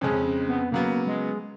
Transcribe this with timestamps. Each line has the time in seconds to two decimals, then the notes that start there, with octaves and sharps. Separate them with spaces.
0.01 F2 C#3 G#3 C#4
0.48 B3
0.71 C#3 F#3 A#3 B3
1.07 G#3